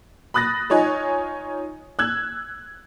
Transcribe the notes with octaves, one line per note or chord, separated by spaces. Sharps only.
B5 D#6 F#6 A6 A#6
D#4 F4 C#5 D#5 G#5
E6 F#6 G#6